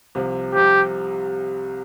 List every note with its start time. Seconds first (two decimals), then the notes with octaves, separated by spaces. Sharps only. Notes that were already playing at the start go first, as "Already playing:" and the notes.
0.15 C2 C3 F3
0.54 C2 C3 F3 G4